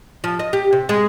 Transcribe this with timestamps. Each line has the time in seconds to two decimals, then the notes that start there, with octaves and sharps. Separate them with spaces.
0.24 F3
0.39 D#5
0.53 G4
0.73 C3
0.89 G#3